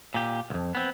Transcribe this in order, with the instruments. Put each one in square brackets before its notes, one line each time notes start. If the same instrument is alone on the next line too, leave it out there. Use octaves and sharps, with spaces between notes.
[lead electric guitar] A#2 G4
C2 F2
B3 C4